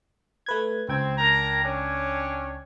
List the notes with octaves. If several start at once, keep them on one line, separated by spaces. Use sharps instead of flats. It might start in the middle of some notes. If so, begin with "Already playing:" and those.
A3 B4 G#6
C#2 C4 G5 G#6
D4 A#4 A#5
C#4 D4 C#5